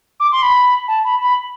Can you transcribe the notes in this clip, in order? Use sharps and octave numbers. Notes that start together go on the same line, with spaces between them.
D6
C6
B5
A5
B5
B5